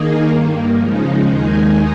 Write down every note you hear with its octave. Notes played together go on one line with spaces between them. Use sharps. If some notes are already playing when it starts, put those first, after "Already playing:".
Already playing: D#3 A#3 D#4 G#4
G2 D#3 A#3
C#3 F3 G#3 D#4
D#2 D#3 G#3 D#4 G#4